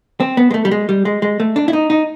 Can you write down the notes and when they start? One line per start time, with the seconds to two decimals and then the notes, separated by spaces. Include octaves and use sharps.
0.20 C4
0.37 B3
0.51 G#3
0.54 A3
0.65 G3
0.71 G#3
0.89 G3
1.05 G#3
1.22 G#3
1.40 A3
1.56 D4
1.68 E4
1.73 D#4
1.90 D#4